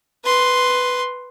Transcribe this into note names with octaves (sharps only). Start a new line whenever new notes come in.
B4 C6